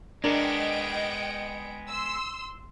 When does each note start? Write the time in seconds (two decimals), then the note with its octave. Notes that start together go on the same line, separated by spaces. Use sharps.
0.24 G#3 B3 D4 A#4 D#5 G5 D7
1.89 C6 E6